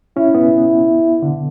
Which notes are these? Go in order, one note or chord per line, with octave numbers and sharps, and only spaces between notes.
C#4 E4
B3
D3